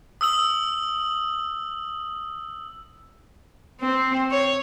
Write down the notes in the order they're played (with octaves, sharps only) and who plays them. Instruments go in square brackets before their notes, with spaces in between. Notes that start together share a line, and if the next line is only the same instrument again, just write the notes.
[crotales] D#6 E6 F#7
[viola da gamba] C4
C#5